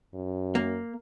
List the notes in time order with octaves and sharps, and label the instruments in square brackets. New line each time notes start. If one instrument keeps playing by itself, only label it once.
[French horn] F#2
[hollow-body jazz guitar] A#3